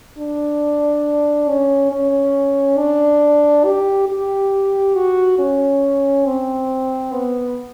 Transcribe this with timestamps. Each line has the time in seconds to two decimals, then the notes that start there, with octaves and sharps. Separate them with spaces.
0.18 D4
1.49 C#4
1.92 C#4
2.78 D4
3.65 G4
4.09 G4
4.95 F#4
5.39 C#4
6.26 C4
7.13 B3